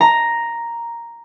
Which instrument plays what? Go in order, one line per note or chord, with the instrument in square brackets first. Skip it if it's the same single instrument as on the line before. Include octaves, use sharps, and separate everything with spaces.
[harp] A#5